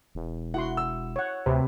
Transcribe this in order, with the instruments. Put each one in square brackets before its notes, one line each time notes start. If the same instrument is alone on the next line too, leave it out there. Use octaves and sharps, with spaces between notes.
[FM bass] E1
[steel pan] E4 F#4 C6 [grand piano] F#5
[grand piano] E6
[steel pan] C#5 F#5
[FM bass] D2 [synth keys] C3 [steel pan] B4